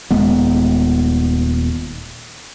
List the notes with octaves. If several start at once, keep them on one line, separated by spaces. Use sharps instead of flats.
D#1 G#3 B3